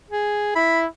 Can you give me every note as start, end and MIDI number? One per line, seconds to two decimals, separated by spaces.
0.10 0.55 68
0.56 0.87 64
0.56 0.80 83